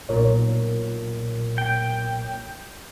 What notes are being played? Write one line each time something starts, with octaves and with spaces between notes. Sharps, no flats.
B1 A#2 A#4 C#5
G5